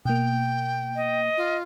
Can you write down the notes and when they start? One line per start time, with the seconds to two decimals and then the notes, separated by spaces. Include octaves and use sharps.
0.05 B2 A#3 G5
0.96 D#5
1.37 F4